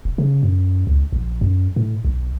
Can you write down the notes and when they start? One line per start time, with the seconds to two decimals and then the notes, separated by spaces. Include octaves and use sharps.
0.05 E1
0.18 C#3
0.43 F#2
0.87 C#2
1.13 A#1
1.41 F#2
1.76 A2
2.05 B1